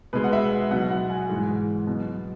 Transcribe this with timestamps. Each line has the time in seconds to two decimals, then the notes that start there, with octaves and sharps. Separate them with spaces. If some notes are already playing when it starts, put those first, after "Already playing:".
0.13 B2 G#3 B4
0.24 F#5
0.33 E5
0.52 E5
0.71 B2 F#3 F#5
0.90 F#5
1.10 G#5
1.29 G#2 E3 G#3
1.87 B2 F#3